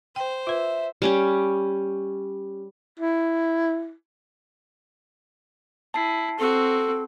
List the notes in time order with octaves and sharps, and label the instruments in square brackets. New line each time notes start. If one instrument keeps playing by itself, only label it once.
[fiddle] C5 [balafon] G5
[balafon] F4 B4 [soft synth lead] E5
[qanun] G3 C#4 G4
[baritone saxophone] E4
[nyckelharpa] E4 [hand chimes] A5 C7
[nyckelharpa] C4 F#4 [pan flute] A4